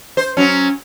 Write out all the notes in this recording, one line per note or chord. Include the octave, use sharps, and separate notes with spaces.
C5
F#3 C#4